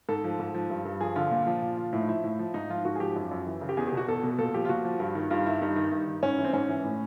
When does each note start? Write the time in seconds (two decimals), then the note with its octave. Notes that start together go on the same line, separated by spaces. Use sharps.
0.09 G#2 A4
0.24 F3
0.39 G#2
0.54 F3
0.70 G2
0.85 G2
1.01 F3 G#4
1.16 D3 F4
1.31 A#2
1.47 F3
1.62 A#2
1.77 F3
1.93 A2 E4
2.01 D#4
2.08 F3 E4
2.24 A2
2.39 F3
2.54 G#2 D#4
2.69 F3 F4
2.85 G#2 F#4
2.95 G#4
3.00 F3 G4
3.16 F#2
3.31 F#2
3.47 E3
3.61 C#3
3.69 G4
3.77 E2 G#4
3.87 G4
3.93 B2 F#4
4.08 E2 A4
4.23 B2
4.38 A#2 A4
4.54 F3 G4
4.65 F4
4.69 A#2 F#4
4.85 F3
5.00 G2
5.15 D#3
5.30 G2 F4
5.46 D#3 E4
5.61 G2 D#4
5.76 D#3
5.92 G2
6.07 D#3
6.23 G#2 C#4
6.38 E3
6.44 C4
6.53 G#2 C#4
6.69 E3
6.84 A2